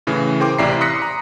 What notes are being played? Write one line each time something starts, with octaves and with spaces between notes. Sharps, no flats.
A2 C#3 E3
G#4 A#4 C5 G5 C6 D6
A1 C3 E4 D5 A#5 C7
C6 D#6 F#6 A#6 B6 C#7
A#5